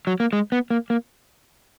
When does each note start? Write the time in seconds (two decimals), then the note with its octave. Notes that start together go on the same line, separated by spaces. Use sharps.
0.07 F#3
0.20 A#3
0.33 G#3
0.52 B3
0.70 A#3
0.90 A#3